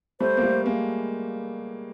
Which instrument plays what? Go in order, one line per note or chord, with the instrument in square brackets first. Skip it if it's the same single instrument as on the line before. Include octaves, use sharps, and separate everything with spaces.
[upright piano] G3 A3 [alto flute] C5
[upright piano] A#3
G3 A3
G#3 A#3